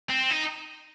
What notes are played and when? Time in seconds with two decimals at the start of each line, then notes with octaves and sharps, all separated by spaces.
0.10 C4
0.31 D#4